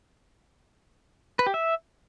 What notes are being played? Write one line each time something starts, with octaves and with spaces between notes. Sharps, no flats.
B4
G4
E5